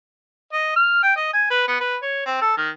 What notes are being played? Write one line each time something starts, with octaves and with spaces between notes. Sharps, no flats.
D#5
F6
G5
D#5
G#5
B4
B3
B4
C#5
C4
A4
D#3